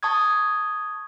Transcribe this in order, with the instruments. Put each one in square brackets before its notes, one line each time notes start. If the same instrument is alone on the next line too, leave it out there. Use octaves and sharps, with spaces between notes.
[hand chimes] A5 C#6 D#6 G#6